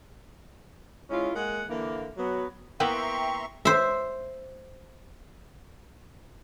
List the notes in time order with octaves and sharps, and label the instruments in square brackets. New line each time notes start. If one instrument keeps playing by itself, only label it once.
[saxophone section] G#3 C#4 E4 F4
G#3 A#3 F#5
D3 E3 A#3
F#3 B3
[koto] A#3 B3 E4 [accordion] E5 A#5 C6 [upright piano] G5 [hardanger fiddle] C#6
[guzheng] C5 E5